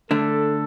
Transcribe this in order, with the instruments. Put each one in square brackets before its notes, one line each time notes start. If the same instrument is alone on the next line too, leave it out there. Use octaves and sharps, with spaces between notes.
[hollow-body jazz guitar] D3 A3 D4 [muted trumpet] A4